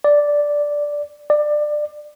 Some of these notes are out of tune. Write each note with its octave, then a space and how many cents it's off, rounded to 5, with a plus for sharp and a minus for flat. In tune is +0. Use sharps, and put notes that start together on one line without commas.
D5 -5
D5 +20